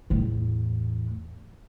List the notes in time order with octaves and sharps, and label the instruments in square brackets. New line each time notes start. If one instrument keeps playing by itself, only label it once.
[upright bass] E2 A2